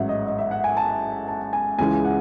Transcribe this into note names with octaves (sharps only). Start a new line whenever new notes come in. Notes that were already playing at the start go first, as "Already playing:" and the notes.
Already playing: A1 G#2 F#3 E5 F#5
D#5
D#5
E5
F#5
G#5
A5
A5
G#5
C#2 C#3 E3 G#3 G#5
F#5